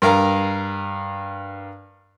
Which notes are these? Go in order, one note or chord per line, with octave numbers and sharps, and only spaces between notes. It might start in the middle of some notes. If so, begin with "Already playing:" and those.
G2 A#4 F5 A#5